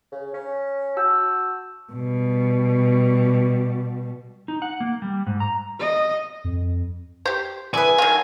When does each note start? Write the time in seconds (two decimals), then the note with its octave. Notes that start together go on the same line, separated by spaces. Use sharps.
0.12 C#3
0.34 C#4
0.96 F#4 A5 E6 G6
1.93 B2 G3
4.48 D#4
4.62 F#5
4.80 A#3
5.02 G3
5.27 G#2
5.40 A#5
5.80 D#5
6.44 F2
7.26 G4 C5
7.74 E4 G#4 B4 D5 G#5
7.98 D#3 F#3 A3 F4